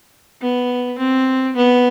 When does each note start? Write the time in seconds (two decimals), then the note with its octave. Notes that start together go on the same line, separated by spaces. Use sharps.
0.42 B3
0.99 C4
1.57 B3